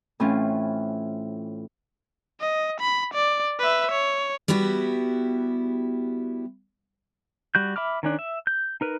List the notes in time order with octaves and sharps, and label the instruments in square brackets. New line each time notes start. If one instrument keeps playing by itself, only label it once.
[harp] A2 E3 C4 C#4 F4
[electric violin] D#5
B5
D5
B4 E5
C#5
[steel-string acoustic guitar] G3 B3 E4 F#4 G4
[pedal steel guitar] G3 F#4 G6
E5 B5 D6 F6
D#3 C#4 D4
E5
G6
D#4 A#4 B4